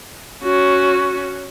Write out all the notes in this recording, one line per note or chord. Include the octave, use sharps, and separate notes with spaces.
C#4 F#4